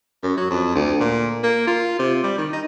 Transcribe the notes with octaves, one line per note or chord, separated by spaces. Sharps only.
F#2
F#3
F2
D2
A#2
A#3
F4
C3
G3
D#3
D#4